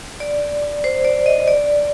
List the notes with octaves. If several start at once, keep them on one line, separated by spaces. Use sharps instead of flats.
D5
C5
D5
D#5
D5